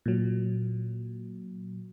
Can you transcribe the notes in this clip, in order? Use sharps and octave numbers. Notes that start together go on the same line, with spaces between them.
A#2 F#3